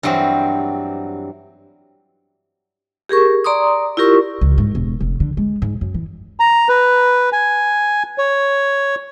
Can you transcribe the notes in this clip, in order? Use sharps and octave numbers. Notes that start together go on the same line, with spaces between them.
G2 E3 F#3 C4 G4
G4 G#4 A#4 C#6
D5 A#5 C6 D6 D#6
E4 F4 G4 A#4 C#6
C#2
G#2
E1
F1
D3
G#3
G#2
F#2
E3
A#5
B4
G#5
C#5